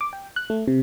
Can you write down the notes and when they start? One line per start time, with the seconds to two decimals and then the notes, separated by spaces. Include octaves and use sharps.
0.01 D6
0.13 G5
0.36 F#6
0.50 A3
0.68 C3